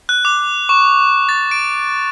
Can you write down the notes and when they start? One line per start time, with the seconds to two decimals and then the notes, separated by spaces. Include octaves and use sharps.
0.09 F#6
0.25 D6
0.69 C#6
1.29 A6
1.51 D7